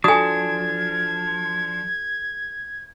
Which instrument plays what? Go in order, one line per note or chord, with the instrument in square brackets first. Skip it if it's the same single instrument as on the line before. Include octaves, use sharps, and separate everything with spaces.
[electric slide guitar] F3 D4 [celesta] F#4 A4 [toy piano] G#5 D#6 [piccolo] G#6